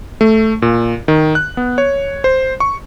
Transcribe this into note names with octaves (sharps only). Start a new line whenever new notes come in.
A3
A#2
D#3
F#6
B3
C#5
C5
C#6